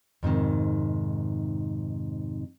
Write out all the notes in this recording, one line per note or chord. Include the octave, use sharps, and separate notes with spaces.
F2 G#2 C3 D#3